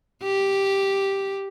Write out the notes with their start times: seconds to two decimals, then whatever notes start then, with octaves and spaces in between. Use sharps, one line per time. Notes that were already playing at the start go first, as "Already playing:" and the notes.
0.23 G4